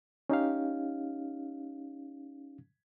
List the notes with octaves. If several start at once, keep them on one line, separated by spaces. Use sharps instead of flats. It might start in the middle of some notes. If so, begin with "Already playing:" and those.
C#4 D#4 G4 F5